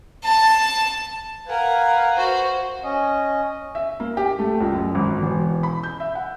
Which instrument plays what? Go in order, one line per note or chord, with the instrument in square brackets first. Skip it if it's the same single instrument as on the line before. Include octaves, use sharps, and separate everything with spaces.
[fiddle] A5
[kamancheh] A#4 G#5 [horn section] B4 F5 [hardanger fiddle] F#5
[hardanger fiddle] F#4 F#5 [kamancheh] C5
[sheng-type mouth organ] C#4 D#5
[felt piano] E5
A#3
G4
A3
C#2
F#2
G#1
E1
B5
G6
E5
F#5